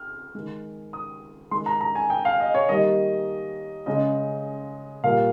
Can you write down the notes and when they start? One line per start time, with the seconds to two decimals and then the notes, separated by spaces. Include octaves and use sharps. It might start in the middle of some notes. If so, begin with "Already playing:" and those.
Already playing: F6
0.35 D#3 G#3
0.93 D#6
1.51 D#3 G#3 C6
1.66 A#5
1.81 A#5
1.95 G#5
2.10 G5
2.25 F5
2.40 D#5
2.55 C#5
2.69 D#3 G3 A#3 D#5
3.86 C#3 G#3 D#5
5.04 A#2 G3 A#3 F5